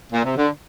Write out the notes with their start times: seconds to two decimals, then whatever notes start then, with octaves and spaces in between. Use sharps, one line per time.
0.13 A#2
0.24 C3
0.36 D3